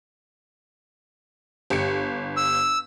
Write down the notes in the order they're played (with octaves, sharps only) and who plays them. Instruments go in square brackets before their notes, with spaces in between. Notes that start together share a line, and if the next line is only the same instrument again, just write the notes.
[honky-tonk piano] G1 G4 C#7
[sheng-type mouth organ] E6